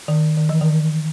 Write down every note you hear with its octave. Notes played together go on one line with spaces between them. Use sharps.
D#3
D#3
E3
D#3